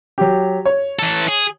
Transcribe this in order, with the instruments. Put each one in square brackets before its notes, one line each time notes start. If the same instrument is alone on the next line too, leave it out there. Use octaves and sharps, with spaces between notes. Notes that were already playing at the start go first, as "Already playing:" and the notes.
[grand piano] F#3 G4
C#5
[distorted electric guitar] E3 A4
G#4